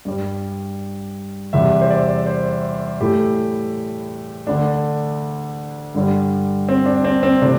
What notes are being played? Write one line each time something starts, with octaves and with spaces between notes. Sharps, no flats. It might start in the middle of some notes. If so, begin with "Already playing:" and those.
G2 G3
E2 C3 G3 E5
C5
D5
C5
A2 E3 A3 G4
D2 D3 A3 D4
G2 D3 G3
C4
D4
C4
C4
C3 E3 A3 D4